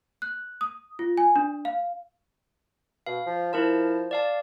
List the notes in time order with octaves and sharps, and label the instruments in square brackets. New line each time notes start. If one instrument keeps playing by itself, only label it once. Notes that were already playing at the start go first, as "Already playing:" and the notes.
[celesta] F#6
D#6
F4
G#5
D4
F5
[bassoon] B2 [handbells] F5
[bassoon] F3
[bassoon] F3 [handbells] E4 A#4 A5
[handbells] D5 F5 A5